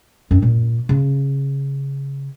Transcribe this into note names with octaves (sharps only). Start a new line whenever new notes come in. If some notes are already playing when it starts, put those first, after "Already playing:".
F#2 C4
A#2
C#3